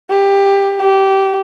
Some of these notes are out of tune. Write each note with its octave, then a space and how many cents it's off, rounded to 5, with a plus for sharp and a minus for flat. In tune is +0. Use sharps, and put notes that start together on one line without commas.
G4 +15
G4 -20